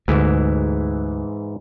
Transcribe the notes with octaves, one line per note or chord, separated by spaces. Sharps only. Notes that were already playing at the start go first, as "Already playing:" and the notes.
D2 G#2 E3 E4